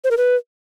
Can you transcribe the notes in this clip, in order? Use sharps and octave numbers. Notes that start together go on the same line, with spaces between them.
C5
A#4
B4